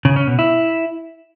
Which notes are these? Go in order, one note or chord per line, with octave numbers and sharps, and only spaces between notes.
C#3
C#4
B2
E4